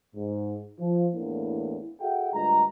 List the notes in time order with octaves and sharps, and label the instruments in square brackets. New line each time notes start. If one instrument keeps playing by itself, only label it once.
[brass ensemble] G#2
F3
E2 A2 A#3 D4 E4
F#4 G#4 A4 E5 F#5 G5
D2 G2 G#3 F4 D#5 A#5